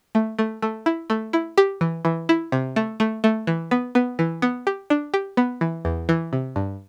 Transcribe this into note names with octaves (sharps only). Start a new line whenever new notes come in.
A3
A3
A3
E4
A3
E4
G4
E3
E3
E4
C3
A3
A3
A3
E3
B3
B3
E3
B3
G4
D4
G4
B3
E3
E2
E3
C3
G2